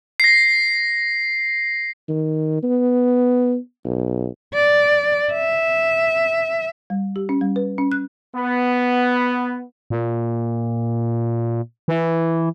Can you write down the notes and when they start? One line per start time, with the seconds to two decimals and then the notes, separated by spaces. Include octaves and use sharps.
0.20 A#6 C7
2.09 D#3
2.63 B3
3.85 B1
4.54 D5
5.33 E5
6.90 G3
7.16 G4
7.29 C#4
7.41 G3
7.56 B4
7.78 C#4
7.92 F#6
8.35 B3
9.90 A#2
11.88 E3